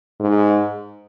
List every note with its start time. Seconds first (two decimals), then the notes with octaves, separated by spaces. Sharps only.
0.20 G#2